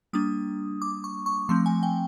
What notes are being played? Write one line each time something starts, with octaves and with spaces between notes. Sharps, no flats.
G3 A#3 D4 D#6
D6
C#6
C#6
F3 A3 C4 C6
G#5
G5